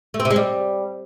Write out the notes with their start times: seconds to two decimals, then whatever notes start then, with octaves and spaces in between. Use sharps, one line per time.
0.14 A3
0.20 C4
0.25 C3
0.30 G#3
0.36 G3